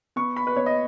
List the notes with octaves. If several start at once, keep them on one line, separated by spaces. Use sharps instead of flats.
B3 C#6
B5
B4
B3 C#5
D#5